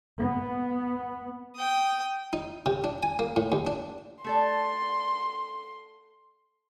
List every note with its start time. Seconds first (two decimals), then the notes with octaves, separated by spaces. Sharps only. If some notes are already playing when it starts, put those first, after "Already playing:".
0.19 B3
1.56 G5 D#6
2.33 D#4
2.66 C3
2.84 D4
3.03 G#5
3.19 A#3
3.36 A2
3.52 D#2
3.67 D4
4.24 A3 A4 D5 C6